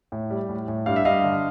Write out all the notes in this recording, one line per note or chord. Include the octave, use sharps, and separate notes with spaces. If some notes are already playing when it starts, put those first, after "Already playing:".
A2
G3
A2
A2
G2 F5
E5
G2 D#5 F5
D3